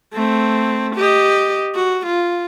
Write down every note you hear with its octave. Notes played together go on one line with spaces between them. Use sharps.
A3 C4
G4 D#5
F#4
F4